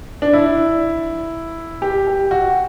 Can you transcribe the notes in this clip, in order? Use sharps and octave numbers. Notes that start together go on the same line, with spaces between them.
D4
E4
G4
G4
F#4